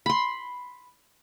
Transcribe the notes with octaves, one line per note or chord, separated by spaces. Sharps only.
B5 C6